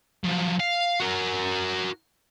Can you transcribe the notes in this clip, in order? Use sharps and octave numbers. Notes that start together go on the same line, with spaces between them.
F3 F#3
F5
F#4 A#4